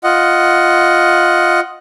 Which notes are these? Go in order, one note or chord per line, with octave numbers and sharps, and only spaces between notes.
F4 D#5 F#5